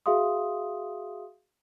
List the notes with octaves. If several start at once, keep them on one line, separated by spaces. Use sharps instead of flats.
F#4 G#4 E5 F5 C6 D#6